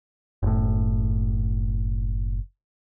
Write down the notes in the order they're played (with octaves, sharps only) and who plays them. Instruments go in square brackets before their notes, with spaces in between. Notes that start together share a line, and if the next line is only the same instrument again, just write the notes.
[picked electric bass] F#1 A2